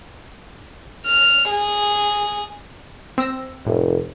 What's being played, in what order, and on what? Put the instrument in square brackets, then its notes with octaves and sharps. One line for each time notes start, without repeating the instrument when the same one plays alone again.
[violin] F6
G#4
[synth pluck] C4 E6 A#6
[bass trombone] F1 [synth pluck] A2